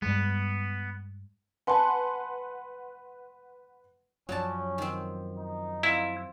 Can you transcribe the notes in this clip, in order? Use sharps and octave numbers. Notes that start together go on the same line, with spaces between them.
G2 G#3 B3
B4 F#5 G#5 A5 C6
F#2 F3 F#3 C#4 D5 A5
D#3 C4
D#4
C4 E4 F4